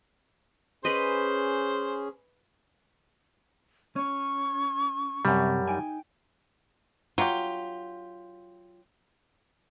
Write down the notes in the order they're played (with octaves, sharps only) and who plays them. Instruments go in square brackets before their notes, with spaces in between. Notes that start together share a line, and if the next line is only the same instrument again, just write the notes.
[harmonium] C#4 G#4 [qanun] B4 D#5 [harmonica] C5
[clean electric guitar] C#4 [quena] C#6
[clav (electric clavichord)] F#2 G3 [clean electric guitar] C3
[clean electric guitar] D#4 G5 G#5
[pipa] F#3 G4 [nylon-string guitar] F4